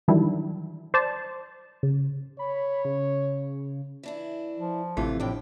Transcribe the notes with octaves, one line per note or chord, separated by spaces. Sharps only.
D#3 E3 F#3 G3 D4 E4
C5 D5 A5
C#3
C#5 B5
C#3
E3 D4 E4
F3
A1 C3 E3 A3 F4
F2 A2 F3 D4 G5